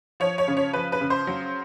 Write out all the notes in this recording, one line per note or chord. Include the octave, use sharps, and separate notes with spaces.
F3 C#5
C#5
C#3
C#5
F3 B4
B4
C#3
C5
F#3